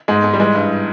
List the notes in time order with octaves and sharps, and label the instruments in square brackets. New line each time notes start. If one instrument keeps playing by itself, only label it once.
[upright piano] G#2 G#3
G#2
G3
E3 G#3
G2